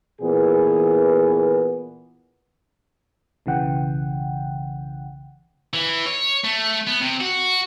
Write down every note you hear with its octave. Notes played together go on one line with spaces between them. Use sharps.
A#2 E3 B3 G#4
B1 C#3 E3 F#5 G5
E3
C#5
A3
B3
C3
F#4